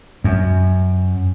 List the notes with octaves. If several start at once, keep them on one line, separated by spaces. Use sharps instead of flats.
F#2